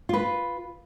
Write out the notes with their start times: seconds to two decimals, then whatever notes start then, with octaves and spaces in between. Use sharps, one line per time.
0.09 F4 B4